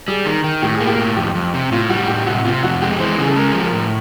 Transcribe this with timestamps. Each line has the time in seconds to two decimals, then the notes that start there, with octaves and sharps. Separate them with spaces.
0.08 G3 G#4
0.26 D#3
0.44 D#3
0.62 A2 G4
0.75 G#4
0.81 A#3
0.87 G4
0.99 A2
1.17 F2 G4
1.35 F2
1.54 C3
1.72 A2 F4
1.90 G3 F#4
2.08 A2 G4
2.26 C3 F#4
2.45 C3 F4
2.63 F2 F#4
2.82 G#3 G4
2.99 E3 C5
3.18 C#3 G#4
3.28 A4
3.36 G#3 A#4
3.54 F3
3.63 A#4
3.72 A2